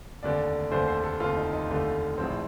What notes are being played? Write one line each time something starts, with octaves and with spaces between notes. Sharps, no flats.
F1 D#2 D3 A3 D5
F1 D#2 D3 A3 C5
C5
A4
F1 D#2 D3 A3 F4
D#4
D#4
F1 D#2 D3 A3
A#1 A2 F3 C4